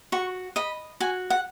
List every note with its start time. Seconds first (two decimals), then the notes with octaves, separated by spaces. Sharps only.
0.12 F#4 C#6
0.56 D#5 B5
1.00 F#4 G#5
1.30 F#5